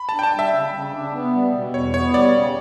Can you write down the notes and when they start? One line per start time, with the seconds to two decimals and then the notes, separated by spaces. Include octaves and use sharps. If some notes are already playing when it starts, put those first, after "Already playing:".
Already playing: B5
0.09 A5
0.14 D4 G5
0.23 A5
0.33 G3
0.39 E5
0.53 C#3
0.73 C#3
0.94 D4
1.13 B3
1.33 G3
1.54 B2
1.73 E2 C#5
1.94 B3 C#5
2.13 G3 D5
2.33 C#3